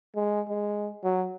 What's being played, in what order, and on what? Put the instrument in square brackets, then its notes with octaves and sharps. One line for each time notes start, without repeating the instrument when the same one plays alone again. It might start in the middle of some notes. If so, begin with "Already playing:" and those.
[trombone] G#3
G#3
F#3